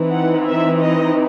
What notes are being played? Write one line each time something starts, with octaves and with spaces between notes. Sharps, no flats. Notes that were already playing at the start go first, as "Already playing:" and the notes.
Already playing: E3 C4 D#4
F#5
E5
D#5